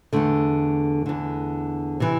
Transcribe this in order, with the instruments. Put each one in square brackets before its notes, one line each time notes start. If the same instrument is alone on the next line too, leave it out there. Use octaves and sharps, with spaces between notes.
[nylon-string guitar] E2 D3 A3
E2 D3
C3 E3